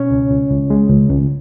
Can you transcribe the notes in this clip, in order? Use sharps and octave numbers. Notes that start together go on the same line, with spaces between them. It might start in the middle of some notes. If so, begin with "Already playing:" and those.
Already playing: B2 C#4 C#5
C#2
C#2
C#2
G#3
C#2
C#2